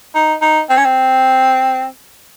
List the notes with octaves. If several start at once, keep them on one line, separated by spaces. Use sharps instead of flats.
D#4
D#4
C4
C#4
C4